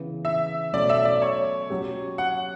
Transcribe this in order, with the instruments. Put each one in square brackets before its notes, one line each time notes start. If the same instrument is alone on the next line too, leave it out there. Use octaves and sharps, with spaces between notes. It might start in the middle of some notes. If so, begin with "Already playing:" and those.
Already playing: [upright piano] C#3 E3 B3
[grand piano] E5
[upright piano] B2 F#3 A3 C#4 [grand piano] D5
[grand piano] E5
D5
C#5
[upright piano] F#3 C#4 G4
[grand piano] F#5